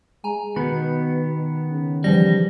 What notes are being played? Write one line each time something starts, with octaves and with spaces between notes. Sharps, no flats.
G#3 G#5 A#5
B2 D#3 B3 B5
C#3
E3 F3 G3 A#6